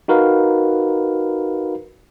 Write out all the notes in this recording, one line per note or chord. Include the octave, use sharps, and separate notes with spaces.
D#4 F#4 A#4 B4 F5